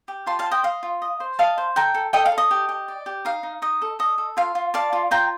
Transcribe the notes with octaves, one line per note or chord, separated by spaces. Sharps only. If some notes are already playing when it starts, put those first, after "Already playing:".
G4
F4 A5 C6
F5 A5
C5
D#5 G5
D#5 F5
F4
D#5
C5
D#5 F5 A5
C5
A4 G5 A#5
A4
A4 D#5 G5
F5
A4
D#5
G4
G4
D5
G4
D#4 F5
D#4
D#4 D#5
A4
A4 D#5
A4
F4 F5
F4
D5 F5 A5
F4
F4 G5 A#5